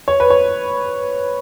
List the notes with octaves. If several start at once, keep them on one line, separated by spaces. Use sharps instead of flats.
C#5
B4
C#5